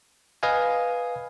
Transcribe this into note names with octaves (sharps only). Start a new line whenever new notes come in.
B4 D#5 F5 G#5